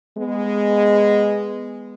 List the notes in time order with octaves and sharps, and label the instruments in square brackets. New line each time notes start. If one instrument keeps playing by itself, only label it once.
[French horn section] G#3 B3